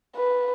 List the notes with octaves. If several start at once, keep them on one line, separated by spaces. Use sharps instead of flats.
B4